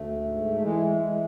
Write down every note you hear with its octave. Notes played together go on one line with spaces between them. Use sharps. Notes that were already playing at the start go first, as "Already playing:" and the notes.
Already playing: D2 A3
G#2
A3
E3 G#3
G#3
E3